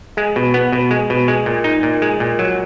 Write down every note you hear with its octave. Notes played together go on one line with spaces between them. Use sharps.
G#3
B2
B3
B2
G#3
B2
G#3
A#2
D#4
A#2
G#3
A#2
F#3